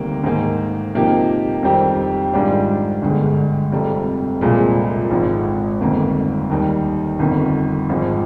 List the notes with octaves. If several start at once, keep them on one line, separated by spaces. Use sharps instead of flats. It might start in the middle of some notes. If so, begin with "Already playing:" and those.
Already playing: D2 C3 D#3 G3 A#3
G#2 D#3 A#3
C3 F3 A#3 D#4 G4
F2 D#3 G3 C4 G4
G#2 D#3 G3 D4 F4
G1 G2 D3 G#3
F1 F2 C3 G3
C2 A#2 F3 G#3
G#1 G#2 F3
G1 F2 D#3 A#3
D#2 D#3 G3
G1 F2 D#3
G#1 G#2 F3 G#3